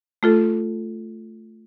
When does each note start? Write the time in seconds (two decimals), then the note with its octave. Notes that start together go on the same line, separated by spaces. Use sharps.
0.23 A3 F4 A4